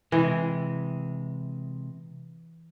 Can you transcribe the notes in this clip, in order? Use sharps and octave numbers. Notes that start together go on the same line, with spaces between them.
C3 E3 G#3